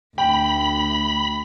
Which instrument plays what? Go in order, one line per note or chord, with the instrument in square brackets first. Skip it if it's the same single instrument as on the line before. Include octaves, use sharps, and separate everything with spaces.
[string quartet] D2 [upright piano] G5 [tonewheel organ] B5